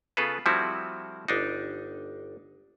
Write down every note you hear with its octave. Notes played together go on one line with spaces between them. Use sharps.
C#3 B3 F4 G#4 A4 B4
F3 G3 A3 C4 E4 F#4
G1 D4 D#4